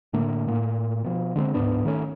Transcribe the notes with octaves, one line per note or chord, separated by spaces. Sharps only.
A2 D3 A3 A#3
A2 A#3
B2 F3
D3 G#3 B3 C4
D1 G#2 B3 D4
D#3 A3 C#4